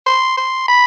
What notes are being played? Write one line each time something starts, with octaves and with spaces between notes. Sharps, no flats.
C6
C6
B5